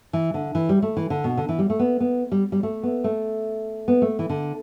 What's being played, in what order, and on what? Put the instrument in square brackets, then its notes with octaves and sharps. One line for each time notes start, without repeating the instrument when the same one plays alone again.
[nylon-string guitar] E3
D3
E3
G3
A3
E3
D3
B2
D3
E3
G3
A3
B3
B3
G3
G3
A3
B3
A3
B3
A3
E3
D3